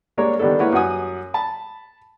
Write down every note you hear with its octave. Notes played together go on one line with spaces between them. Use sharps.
G3 G#3 A#3 D4 A#4 C#5
D#3 G3 B3 D4 A4
G#3 A#3 E4 B4 C#5 F#5
F#2 G3 F#5 G#5 D#6
A5 B5